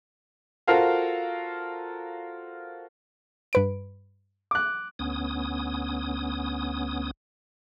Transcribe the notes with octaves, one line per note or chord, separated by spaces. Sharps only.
F4 F#4 A4 A#4 C5 F5
G2 B4 D7
D6 F#6
D2 B3 C#4 D#6